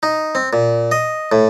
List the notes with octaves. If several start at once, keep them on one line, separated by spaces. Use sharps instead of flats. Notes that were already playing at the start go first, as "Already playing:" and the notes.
D#4
C4
A#2
D#5
A2